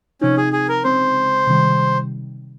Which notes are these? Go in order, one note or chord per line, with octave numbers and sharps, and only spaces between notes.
C3 F3 C4 C#4 D#4
G#4
G#4
A#4
C#3 G#3 C4 C5
C3 D#3 G3